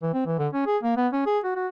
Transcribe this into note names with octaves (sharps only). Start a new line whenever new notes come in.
E3
C4
E3
D3
C#4
G#4
A#3
B3
C#4
G#4
F#4
F#4